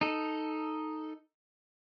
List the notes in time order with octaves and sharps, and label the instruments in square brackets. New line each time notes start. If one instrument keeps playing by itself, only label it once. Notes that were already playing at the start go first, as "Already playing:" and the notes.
[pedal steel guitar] D#4 A4